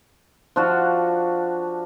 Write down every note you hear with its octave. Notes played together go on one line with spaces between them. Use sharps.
F3 D4 F#4